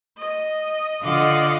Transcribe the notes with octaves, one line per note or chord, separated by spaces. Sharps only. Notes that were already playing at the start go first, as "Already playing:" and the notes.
D#5
D3 F4 D#5 F#5 D6